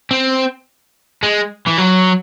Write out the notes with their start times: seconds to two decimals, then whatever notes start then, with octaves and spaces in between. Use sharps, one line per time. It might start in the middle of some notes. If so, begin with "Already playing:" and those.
0.11 C4
1.23 G#3
1.67 E3
1.78 F#3